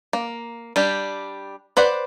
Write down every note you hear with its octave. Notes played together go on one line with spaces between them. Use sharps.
A#3
G3 D4 G4
B4 C5 D5 F#5